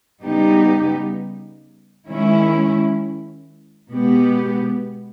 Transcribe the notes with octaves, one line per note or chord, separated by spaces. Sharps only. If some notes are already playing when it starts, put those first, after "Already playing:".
C#3 G3 B3 D#4 G4
D#3 G#3 C#4 E4
B2 G#3 B3 G4